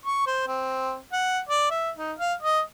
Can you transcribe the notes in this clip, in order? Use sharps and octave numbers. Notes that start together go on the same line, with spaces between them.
C#6
C5
C4
F#5
D5
E5
D#4
F5
D#5